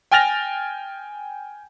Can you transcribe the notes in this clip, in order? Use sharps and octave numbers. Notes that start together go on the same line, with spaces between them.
G5 G#5 F6 A6 A#6 F7